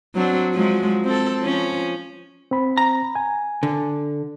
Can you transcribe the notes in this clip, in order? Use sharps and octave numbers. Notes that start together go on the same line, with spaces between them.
F#3 C4 D4
F3 F#3 G#3
C4 A4
F3 C#4
C4 B5
A#5
G#5
D3